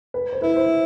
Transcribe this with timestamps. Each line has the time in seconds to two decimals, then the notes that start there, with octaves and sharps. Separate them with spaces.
0.14 B4
0.33 C5
0.42 E4 B4
0.56 C5